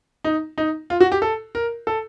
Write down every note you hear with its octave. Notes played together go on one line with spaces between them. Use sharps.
D#4
D#4
F4
F#4
G4
A4
A#4
A4